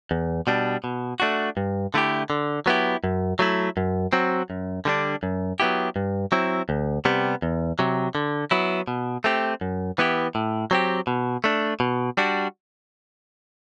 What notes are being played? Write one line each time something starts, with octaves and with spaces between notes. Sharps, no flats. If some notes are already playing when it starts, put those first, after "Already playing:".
E2
B2 G3 D4
B2
A3 D4 F#4
G2
D3 A3 E4 G4
D3
F#3 B3 E4 G4
F#2
F#3 A3 E4
F#2
F#3 C4 F#4
F#2
D3 G3 B3 D4
F#2
F#3 B3 E4 G4
G2
F#3 C4 E4
D2
C3 G3 B3
E2
C3 F#3
D3
F#3 B3 E4
B2
A3 C4 G4
F#2
E3 B3 E4 G4
A2
F#3 C4 G4
B2
A3 D4
B2
G3 D4 F#4